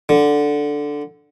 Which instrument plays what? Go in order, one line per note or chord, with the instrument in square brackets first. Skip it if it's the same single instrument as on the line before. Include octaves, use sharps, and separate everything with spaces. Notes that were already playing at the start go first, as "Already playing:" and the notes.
[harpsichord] D3